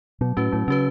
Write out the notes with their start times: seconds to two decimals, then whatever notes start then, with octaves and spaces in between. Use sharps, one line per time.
0.21 B2 F#3
0.37 A2 C#4 F#4 B4
0.52 A2 F#3
0.68 C#3 C#4 F#4 B4